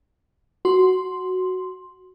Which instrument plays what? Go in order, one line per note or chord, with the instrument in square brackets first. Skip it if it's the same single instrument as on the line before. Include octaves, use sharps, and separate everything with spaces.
[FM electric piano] F#4 C6